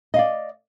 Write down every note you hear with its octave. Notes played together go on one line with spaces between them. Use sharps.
D5 D#5 F5